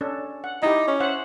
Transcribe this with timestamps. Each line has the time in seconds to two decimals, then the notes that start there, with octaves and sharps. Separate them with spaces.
0.01 C#4 D4 A4
0.44 F#5
0.63 D#4 E4 G4
0.88 C#4
1.00 C5 E5 F#5